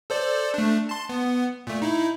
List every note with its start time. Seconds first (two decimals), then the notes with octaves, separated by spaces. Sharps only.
0.10 A4 C5 D5
0.54 A3 D4
0.89 A5 C6
1.09 B3
1.67 A#2 A3
1.82 D#4 E4